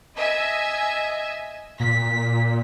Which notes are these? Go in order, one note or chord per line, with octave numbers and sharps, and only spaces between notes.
D#5 E5 G#5
A#2 B6